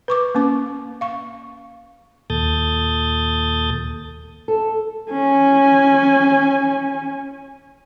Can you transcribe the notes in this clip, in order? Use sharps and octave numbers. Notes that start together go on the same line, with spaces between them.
B4 C#6 D6
A#3 C#4 D6
F5 C#6
D#2 A#2 A4 D#6 G6 A6
A4
C#4 G#5